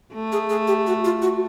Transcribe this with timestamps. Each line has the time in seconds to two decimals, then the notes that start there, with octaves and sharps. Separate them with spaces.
0.14 A3
0.32 G#4
0.50 G#4
0.67 G4
0.87 F#4
1.05 F4
1.22 F#4